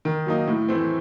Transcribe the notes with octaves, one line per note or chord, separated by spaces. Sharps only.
D#3
F#3 A#3 D#4
A2
E3 A3 C4